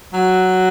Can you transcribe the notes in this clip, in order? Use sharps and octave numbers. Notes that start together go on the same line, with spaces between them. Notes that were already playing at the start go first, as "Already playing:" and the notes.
F#3